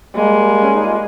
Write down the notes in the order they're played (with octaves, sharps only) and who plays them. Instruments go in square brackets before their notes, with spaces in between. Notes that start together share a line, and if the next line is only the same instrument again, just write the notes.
[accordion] G3 A#3 [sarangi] G#3
[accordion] C#4
D#4
F4